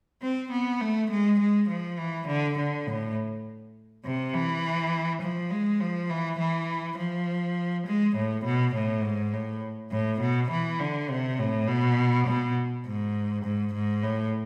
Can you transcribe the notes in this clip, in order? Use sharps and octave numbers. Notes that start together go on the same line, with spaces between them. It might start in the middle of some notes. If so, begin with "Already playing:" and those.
C4
B3
A3
G#3
G#3
F3
E3
D3
D3
A2
C3
E3
F3
G#3
F3
E3
E3
F3
G#3
A2
B2
A2
G#2
A2
A2
B2
E3
D3
C3
A2
B2
B2
G#2
G#2
G#2
A2